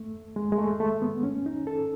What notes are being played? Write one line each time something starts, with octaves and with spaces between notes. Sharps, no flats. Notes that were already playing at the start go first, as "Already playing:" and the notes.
Already playing: A3
G#3
G#3
A3
A3
B3
C#4
D#4
A4